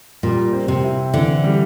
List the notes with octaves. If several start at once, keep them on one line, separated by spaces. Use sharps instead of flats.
A#2 G3
C4
C3
E4
D3 E3
G3